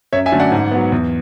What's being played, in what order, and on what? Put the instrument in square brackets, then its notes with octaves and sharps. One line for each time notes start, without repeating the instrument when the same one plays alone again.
[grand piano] F#2 C#5 E5
E5 G#5
D3 F#3 A3 C#4
D5 F#5
G#2
F#3 B3
E2